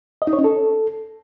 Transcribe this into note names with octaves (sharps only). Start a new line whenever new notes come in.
D#5
D#4
C#5
C#4
A4